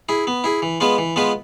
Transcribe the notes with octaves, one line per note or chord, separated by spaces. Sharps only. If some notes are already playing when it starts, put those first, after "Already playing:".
E4 G#4
B3
E4 G#4
E3
G#3 B3 F4 B4
E3
G#3 B3 F4 B4